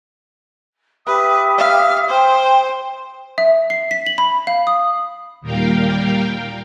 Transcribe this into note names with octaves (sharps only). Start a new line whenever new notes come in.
G4 B4 E5 D#6
F5
C5 G5
E5
C7
B6
F#7
B5
F5
D#6
D#2 A#2 G3 A#4 F5 G5